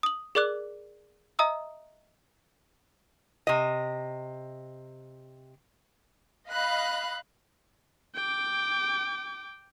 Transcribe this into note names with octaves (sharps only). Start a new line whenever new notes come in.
D#6 F#7
G#4 A#4 D5 D6 F#6
D#5 E5 A#5 D#6 E6
C3 D#5
D#5 F5 B5 F#6
G5 D6